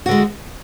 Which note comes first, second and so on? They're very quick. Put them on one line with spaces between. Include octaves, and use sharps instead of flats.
F#4 D3 G#3